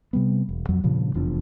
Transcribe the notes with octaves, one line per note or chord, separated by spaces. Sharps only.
C3 G3 B3
E1
F2 F#3
G2 A#2 C#3 F3
F1 E2 F3 D4